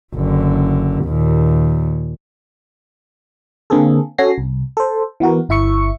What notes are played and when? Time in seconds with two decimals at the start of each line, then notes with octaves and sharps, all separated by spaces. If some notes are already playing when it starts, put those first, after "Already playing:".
0.15 F#1 D3
1.05 D#2 A#2
3.70 D3 A#3 C4 G#4 A4
4.18 C#4 F#4 A4 G#5 A#6 C7
4.38 C2
4.77 A4 C5
5.20 E3 B3 F#4 A#4
5.49 G1 E4 E5 C#6 C#7